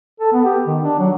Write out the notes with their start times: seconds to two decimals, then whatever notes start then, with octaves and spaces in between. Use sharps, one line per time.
0.20 A4
0.33 B3
0.45 G4
0.67 D#3
0.81 D4
0.99 F#3